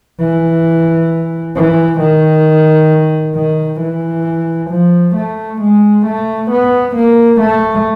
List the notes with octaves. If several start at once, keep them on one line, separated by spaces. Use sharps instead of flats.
E3
E3
D#3
D#3
E3
F3
A3
G#3
A3
B3
A#3
A3